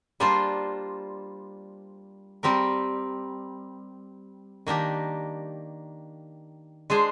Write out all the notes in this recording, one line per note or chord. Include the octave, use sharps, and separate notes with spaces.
G3 A#3 D4 F4 C5
G3 C4 G4 A#4
D#3 A#3 D4 G4
G#3 D4 G#4 C5